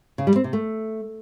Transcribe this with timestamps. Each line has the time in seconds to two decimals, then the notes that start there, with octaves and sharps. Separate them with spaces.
0.18 C#3
0.27 G3
0.36 C4
0.44 C3
0.53 A3